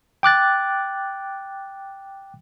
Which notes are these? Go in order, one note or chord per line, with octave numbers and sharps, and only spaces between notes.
G5 D6 F#6 A6